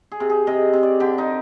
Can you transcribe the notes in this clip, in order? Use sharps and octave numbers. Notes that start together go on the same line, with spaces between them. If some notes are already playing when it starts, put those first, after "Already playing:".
G#4
C3
G#4
C3 D#5
C3
D5
D3 G4
D#4